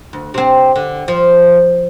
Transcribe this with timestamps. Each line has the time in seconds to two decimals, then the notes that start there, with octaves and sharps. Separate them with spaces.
0.13 D2
0.34 C3 C4
0.76 D3
1.08 F3